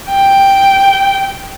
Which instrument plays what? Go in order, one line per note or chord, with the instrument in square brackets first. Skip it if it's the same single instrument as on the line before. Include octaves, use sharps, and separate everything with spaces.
[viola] G5